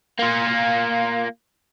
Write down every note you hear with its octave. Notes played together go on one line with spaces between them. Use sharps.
A#3 F4